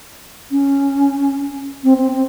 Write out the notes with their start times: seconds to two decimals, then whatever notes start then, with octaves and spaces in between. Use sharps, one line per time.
0.51 C#4
1.84 C4
1.98 C4
2.13 C4